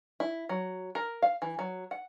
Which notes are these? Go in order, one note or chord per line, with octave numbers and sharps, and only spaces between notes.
E4
F#3
A#4
F5
E3
F#3
F#5